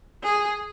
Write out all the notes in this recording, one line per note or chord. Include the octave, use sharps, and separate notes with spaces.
G#4